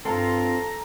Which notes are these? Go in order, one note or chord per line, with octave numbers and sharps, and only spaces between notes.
G2 C4 F4 A4 A#5